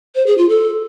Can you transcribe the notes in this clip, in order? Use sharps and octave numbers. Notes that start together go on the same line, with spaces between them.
C5
G#4
F4
A4